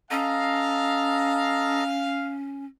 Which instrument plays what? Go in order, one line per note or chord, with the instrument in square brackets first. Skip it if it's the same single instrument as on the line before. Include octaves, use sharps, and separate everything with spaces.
[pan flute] C#4 [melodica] A4 D#5 A#5 [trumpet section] F5